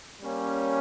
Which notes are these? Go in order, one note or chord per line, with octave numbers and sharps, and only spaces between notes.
G3 A#3 C#4